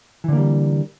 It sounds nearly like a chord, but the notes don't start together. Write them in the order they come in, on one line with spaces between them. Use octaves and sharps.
E3 D3 A#3 G3